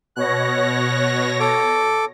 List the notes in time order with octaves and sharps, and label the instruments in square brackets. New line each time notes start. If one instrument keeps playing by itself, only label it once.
[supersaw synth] B2 C#5 A#6 [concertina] F#6
[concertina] A4 D6